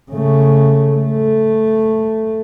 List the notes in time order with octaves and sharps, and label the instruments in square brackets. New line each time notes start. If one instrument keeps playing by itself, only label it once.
[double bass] C#3 A3
A3